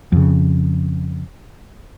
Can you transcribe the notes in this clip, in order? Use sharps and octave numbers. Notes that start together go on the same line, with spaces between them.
F2 C#3